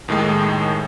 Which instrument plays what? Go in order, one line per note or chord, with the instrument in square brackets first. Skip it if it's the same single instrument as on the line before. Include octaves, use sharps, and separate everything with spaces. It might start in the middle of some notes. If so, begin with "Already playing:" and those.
[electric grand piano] D#2 A2 D#3 G#3